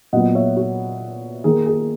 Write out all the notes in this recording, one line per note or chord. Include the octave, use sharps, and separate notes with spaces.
A#2 F#3 B3 D#5 F#5
C#5 E5
F#4
D#3 A#3 G#4
G#4